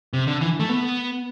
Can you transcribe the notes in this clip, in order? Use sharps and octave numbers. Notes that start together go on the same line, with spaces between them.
C3
D3
E3
A3
B3